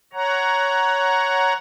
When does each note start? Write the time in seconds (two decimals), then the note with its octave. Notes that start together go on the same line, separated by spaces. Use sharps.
0.13 C#5 F#5 A#5